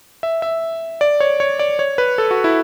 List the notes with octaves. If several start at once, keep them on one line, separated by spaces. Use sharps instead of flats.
E5
E5
D5
C#5
C#5
D5
C#5
B4
A4
F#4
E4